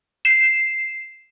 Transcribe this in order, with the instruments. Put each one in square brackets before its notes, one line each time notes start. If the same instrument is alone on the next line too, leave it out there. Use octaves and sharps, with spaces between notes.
[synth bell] C7 E7